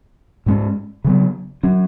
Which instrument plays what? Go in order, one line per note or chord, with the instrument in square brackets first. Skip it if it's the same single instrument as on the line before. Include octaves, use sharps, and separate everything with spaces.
[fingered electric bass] G#2 G#3 C#4
C#3 F#3 B3
F#3 C#4